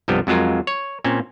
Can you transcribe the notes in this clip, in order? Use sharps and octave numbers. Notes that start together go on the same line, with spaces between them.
C2 G2 F3 G3 B3
F2 F#3 G#3 F4 A#4
C#5
A#2 C4 C#4